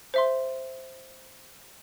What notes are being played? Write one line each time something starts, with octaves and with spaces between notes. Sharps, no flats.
C5 E5 C6